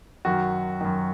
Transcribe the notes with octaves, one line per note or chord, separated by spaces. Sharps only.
F#2 D#3 F#4
F#2 D#3